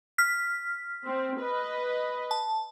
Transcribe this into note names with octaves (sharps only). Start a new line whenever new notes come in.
F6 B6
C4
B4 D#5
A5